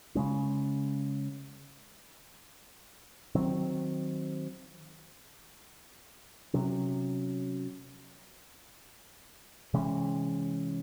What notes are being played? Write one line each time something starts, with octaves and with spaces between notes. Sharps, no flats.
C#3 G#3 C#4
D#3 F#3 C4
C3 F#3 C#4
C3 E3 G#3 C#4